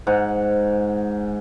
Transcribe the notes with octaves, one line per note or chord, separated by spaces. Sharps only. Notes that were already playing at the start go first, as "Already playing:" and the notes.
G#2 F#5